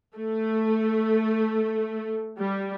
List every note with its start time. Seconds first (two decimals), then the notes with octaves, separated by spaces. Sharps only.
0.15 A3
2.38 G3